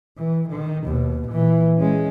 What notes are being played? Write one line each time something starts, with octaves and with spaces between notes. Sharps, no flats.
E3
D#3
D#2 B2
A#2 E3
G#3 C#4